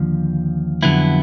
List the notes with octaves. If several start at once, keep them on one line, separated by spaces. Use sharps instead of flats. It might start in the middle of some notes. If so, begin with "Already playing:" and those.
Already playing: D#2 D3 F3
F2 D3 F#3 B3 E4